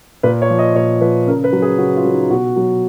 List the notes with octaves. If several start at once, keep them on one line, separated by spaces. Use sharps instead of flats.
A#2 B4
C#5
F3
D#5
A#2 C#5
F3 B4
C#3 A#4
B4
F#3
G#4
C#3 F#4
F4
F#3
D#4
B2 F#4
F#3